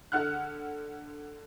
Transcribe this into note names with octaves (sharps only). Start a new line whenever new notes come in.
D3 F#5 F6 F#6